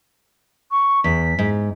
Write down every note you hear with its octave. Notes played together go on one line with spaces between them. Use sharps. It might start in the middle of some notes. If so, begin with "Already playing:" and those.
C#6
E2 B6
G#2